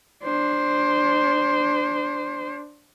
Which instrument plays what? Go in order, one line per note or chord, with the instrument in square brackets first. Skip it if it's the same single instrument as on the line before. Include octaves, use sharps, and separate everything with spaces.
[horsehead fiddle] D4 C5